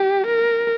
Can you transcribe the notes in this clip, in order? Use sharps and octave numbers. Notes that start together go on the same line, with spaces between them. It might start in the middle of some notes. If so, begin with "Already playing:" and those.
Already playing: G4
A#4